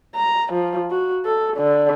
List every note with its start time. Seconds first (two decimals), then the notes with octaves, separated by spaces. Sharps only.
0.15 A#5
0.53 F3
0.91 F#4
1.25 A4
1.57 D3